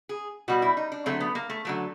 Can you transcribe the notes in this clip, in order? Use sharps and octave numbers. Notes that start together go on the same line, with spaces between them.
G#4
B2 G3 F#4
E4
D#4
D4
D3 F#3 A3 C4
B3
A#3
A3
D3 F#3 A3